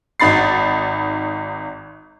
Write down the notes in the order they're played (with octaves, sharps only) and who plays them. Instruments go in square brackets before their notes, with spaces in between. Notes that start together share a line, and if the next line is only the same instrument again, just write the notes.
[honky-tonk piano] G#1 D#4 B5 A6 C7